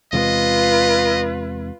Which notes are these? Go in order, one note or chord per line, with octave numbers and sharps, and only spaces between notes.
E2 C3 G#3 F4 B4 D#5